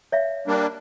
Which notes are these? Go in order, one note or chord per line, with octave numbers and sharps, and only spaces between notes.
C#5 E5 F5
G3 A#3 D4